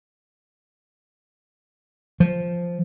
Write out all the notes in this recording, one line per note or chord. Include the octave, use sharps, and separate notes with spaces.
F3